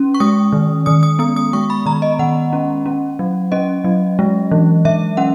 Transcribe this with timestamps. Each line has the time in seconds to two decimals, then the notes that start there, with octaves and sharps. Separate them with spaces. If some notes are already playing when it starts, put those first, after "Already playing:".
Already playing: C#4
0.14 C#6
0.20 G#3 D#6
0.53 D#3
0.86 D#3 D#6
1.03 D#6
1.19 B3 D#6
1.36 D#6
1.53 G#3 C#6
1.70 B5
1.86 D#3 A#5
2.02 D#5
2.19 D#3 F#5
2.53 C#4
2.86 C#4
3.19 F#3
3.52 C#4 D#5
3.84 F#3
4.19 G#3
4.52 E3
4.85 E3 E5
5.17 C#4 F#5